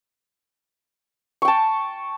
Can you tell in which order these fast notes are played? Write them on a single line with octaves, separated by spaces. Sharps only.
C#6 G5 A5